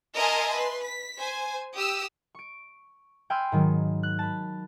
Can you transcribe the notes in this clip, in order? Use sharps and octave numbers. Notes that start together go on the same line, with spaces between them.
A#4 D#5 E5 G#5 A5 C6
B4 C6
B6
C5 G#5
G4 D#6 E6
C#6 D7
G5 G#5 B5 C6 E6 F6
G#2 D#3 F#3
F#6
A5 B5